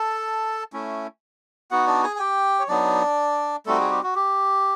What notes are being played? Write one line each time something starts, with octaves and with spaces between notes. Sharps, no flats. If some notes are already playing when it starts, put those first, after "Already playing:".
Already playing: A4 A5
A3 C#4 E4
B3 D#4 F#4 F#5
D4 D5
G#4 G#5
G#5
G4 G5
C#5
F#3 B3 D4 D#4 D5
G3 A3 C4 D#4 F#4 A4
G#4
G4
F#4
G4